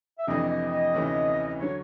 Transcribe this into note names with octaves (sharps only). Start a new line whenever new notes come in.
E5
F2 C3 E3 A3 D4 D#5
D#5
D#5
D2 C3 E3 A3 C#4
D3 F#3 C#5